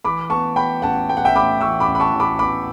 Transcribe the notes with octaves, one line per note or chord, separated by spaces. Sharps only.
E3 B5 D6
B3 A5 C#6
B3 G5 B5
A1 F#5 A5
B3 G5
F#5
E5 G5
A2 B5 D6
E3 C#6 E6
B5 D6
A1
B5
A5 C#6
E3
B5 D6
B3 B5 D6